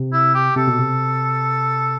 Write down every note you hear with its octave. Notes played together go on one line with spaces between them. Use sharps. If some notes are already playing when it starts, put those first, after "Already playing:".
Already playing: C3
E4
G4
C3 A4
B2
C3